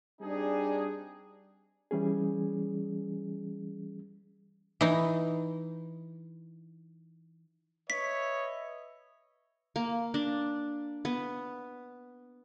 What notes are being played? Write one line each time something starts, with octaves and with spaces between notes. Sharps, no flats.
G3 C4 D4 D#4 G#4
E3 G3 C#4 G#4
E3 D#4
B4 C#5 D#5 E5 B6
A#3
D4
B3